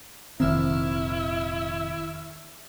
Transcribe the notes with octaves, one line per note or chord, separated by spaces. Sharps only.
F1 A#2 D#3 C4 E4 E5 F6